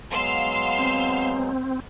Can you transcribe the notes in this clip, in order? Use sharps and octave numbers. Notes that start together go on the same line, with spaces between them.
F#3 G#3 B3 F5 C6 E6
C4